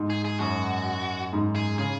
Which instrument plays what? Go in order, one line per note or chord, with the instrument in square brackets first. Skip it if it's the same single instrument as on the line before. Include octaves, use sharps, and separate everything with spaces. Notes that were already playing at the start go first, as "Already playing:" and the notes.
Already playing: [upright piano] G#2
[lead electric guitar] G#4
G#4
[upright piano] F#2 [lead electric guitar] F#4
[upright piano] G#2
[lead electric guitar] G#4
[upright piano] C#3 [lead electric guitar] G#4